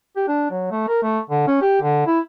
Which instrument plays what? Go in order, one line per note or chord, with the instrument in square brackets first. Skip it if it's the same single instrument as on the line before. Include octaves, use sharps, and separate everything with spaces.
[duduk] G4
D4
F#3
A3
A#4
A3
D3
C#4
G4
D3
E4